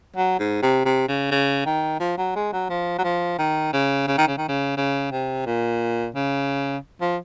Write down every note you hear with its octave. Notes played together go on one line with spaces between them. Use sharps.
F#3
G#2
C3
C3
C#3
C#3
D#3
F3
F#3
G#3
F#3
F3
F#3
F3
D#3
C#3
C#3
D#3
C#3
D#3
C#3
C#3
C3
A#2
C#3
F3